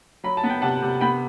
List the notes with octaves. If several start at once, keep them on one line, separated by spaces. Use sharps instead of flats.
F#3 B5
A5
B3
G5
C3 F#5 A5
C3
B3 G5 B5